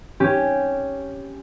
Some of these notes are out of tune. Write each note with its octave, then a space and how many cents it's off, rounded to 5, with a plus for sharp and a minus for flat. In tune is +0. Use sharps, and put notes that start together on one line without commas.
C#4 +0 G4 +0